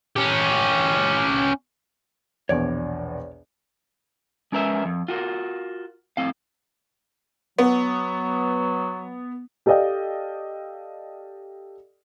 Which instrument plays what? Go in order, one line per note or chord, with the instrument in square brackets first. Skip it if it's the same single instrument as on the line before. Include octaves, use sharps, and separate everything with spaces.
[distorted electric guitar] C#4 G4
[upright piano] A#1 E2 B2 [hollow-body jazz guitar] C#5 D5
[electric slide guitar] G#3 C#4 A#4 B4 E5
F2
F4 F#4 A#4
A2 C4 F5
[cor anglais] F#3 [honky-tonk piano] B3
[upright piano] G4 A4 D5 D#5 F5 G5